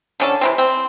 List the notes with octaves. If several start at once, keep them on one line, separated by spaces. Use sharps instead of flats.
D3 C#4 A4
C3 E3 C4
C4